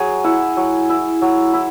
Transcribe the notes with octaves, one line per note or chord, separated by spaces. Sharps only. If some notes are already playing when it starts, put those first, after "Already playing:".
Already playing: F#3 G#4
E4 F#5
F#3
E4
F#3
E4